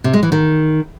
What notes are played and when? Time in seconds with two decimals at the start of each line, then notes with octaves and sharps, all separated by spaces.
0.04 C3
0.13 G#3
0.23 E3
0.32 D#3